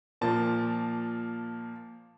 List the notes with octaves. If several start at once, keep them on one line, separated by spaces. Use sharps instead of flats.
A#2 F3 A#3 A5